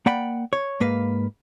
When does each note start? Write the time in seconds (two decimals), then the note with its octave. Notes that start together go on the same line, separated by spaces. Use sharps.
0.06 A#3 D5 F#5 G5 B5
0.53 C#5
0.80 G#2 A#3 B4 F5